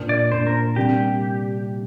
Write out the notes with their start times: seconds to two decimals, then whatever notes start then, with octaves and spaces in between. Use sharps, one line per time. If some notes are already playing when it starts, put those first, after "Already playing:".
Already playing: A#2 A#3 D4
0.09 D5
0.32 A#2 A#3 D4 C5
0.47 A#4
0.76 C3 G3 A#3 D4 G4